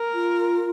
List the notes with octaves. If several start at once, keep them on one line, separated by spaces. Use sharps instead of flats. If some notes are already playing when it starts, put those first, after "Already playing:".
Already playing: A#4
F4